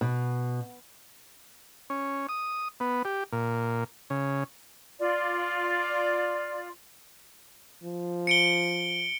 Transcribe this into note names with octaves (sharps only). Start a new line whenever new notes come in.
B2
C#4
D#6
B3
G4
A#2
C#3
F4 D5
F3
C#7 D7 G7